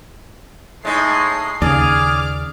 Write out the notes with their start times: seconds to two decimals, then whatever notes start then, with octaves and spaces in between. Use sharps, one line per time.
0.85 A2 G#3 D#4 C7
1.62 D#2 C#3 G#4 D5 D6 F6